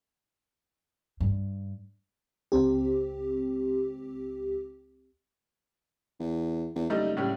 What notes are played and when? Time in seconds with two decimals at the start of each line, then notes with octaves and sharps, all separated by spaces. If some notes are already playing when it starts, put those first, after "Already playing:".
1.20 G2
2.52 C#2 C4 G4
6.20 E2
6.76 E2
6.90 F#1 G3 A3 D#4
7.17 A2 C#3 G3